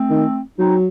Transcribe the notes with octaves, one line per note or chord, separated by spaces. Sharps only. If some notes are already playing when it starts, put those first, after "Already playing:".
Already playing: A3 C4
D#3
F#3 C4 D#4